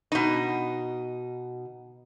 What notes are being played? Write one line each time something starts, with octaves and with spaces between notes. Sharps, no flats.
B2 D#4